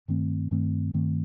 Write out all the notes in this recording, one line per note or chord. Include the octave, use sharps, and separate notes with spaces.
G2 D#3 A3 C4
G2 D#3 A3 C4
G2 D#3 A3 C4